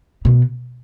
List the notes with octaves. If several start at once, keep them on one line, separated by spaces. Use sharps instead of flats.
B2